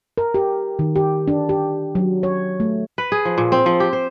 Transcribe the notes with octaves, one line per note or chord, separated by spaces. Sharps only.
A#4
G4
D#3
G4
D4
G4
F#3
C#5
A3
B4
G#4
F3
A#2
C4
F3
G4
C5